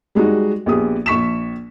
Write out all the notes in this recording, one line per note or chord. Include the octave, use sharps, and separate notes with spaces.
G3 G#3 D#4 F#4
A#1 B3 G4 G#4 D#6
A#1 C#6 B6 E7